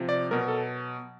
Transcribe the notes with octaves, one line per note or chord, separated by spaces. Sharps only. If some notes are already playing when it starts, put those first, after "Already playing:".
Already playing: C3 F3
D5
B2 F#3 A#4
A4